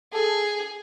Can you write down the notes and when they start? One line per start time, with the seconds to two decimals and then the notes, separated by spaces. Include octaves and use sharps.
0.13 G#4 A4